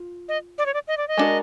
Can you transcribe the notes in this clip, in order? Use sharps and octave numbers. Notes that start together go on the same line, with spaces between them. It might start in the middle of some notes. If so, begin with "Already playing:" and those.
Already playing: F4
D#5
D5
C#5
D5
D#5
D5
D#5
G#3 B3 D4 F#4 A#4